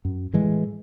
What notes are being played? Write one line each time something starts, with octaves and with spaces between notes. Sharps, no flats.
F#2
A2 E3 G#3